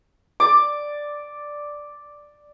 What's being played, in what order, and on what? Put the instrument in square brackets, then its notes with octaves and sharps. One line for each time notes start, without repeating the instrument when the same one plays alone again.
[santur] D5 D6